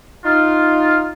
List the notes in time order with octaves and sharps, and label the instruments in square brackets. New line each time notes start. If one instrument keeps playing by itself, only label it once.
[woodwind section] D#4 F4